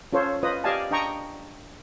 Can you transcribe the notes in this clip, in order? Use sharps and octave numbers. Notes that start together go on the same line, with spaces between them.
C#4 F4 A4 C5 C#5
F4 B4 C5 D#5 D#6
G4 D5 D#5 F5 G#5 A5
D4 D#5 G5 A#5 C#6